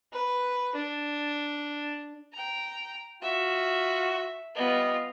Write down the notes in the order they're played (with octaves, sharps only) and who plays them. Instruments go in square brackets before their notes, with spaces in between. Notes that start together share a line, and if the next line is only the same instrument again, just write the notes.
[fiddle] B4
D4
G5 A#5
[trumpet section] F4 F#4 [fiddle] E5
[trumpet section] G3 D#5 [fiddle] B3 F4